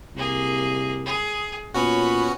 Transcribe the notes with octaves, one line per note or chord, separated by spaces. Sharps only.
C2 A#3 G#4
G#4
A#2 B3 C#4 F#4 C#5 B5